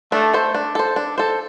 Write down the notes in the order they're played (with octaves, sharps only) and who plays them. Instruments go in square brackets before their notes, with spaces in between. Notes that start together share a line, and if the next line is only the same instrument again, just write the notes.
[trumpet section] A3 [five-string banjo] D4
[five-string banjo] A4 C5
D4
A4 C5
D4
A4 C5